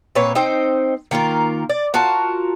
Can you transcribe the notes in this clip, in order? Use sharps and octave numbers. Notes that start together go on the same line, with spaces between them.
A#2 C4 B4 C#5
C4 D#4 C5 G5
D#3 A#3 F4 A#4
D5
F4 F#4 A#4 A5